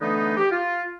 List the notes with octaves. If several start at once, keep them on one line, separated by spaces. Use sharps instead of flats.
D3 E3 A3 B3 D#4
G4
F4